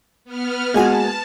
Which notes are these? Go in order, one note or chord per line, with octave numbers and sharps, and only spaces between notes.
B3 F6
G#3 A#3 F#4 G#4 G#5 A5